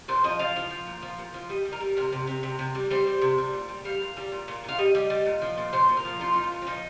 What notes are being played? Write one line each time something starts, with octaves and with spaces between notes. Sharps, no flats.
A#2 C5
F3 D#5
F3 F5
F3
F3
A#2
F3
A#2
F3
G3 D#5
G3
A#4
G3
C3 A#4
C3
C3
C3
C3
G3
G3 C5
G3
C3
G3
A#2
G3
G3 F5
A#2
G3
A#2
A#2
A#2 F5
G3 D#5
G3
G3
A#2
F3
A#2
A#2 C5
A#2
A#4
F3
A#2 F4
F3 D#4
F4
A#2
C4
F3 D#4